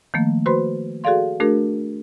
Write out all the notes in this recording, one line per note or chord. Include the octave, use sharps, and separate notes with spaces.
D#3 F3 A3 A#3
F#4 B4 C5 B5 C6
F#4 G#4 A4 D5 F5 C6
A3 D4 F#4 G#4 A#4